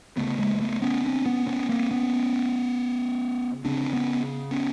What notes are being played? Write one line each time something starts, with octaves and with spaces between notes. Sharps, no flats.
D2 C#3 A3 B3
G#3 A#3
A3 B3
B3 C#4
C4 D4
B3 C#4
B3 C#4
A#3 C4
B3 C#4
D2 C#3 C4 D4
B3 C#4
B3 C#4